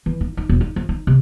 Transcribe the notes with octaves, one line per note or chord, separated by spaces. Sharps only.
E3
D#4
D#4
E1
D#4
F3
D#4
C3